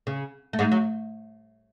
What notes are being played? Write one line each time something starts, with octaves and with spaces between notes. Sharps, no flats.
C#3
A3
G#2 G#3
F#3